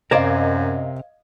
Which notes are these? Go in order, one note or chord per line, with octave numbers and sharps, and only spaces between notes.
F#2 C3 A#4 C5 D5 D#5 F5 G#6